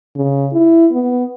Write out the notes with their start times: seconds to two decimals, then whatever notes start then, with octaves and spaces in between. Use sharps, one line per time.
0.16 C#3
0.53 E4
0.92 B3